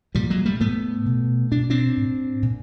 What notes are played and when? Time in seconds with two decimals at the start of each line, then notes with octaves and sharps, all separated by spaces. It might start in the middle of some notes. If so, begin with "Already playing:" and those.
0.15 A#2 F3 G3
0.30 F#3 G#3
0.45 G3 A3
0.60 A2 A3 B3
1.06 B2
1.52 B2 D4
1.70 C4 D4
1.97 A2
2.42 A#2